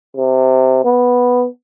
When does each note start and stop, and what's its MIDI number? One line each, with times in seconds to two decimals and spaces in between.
0.16 0.83 48
0.84 1.47 59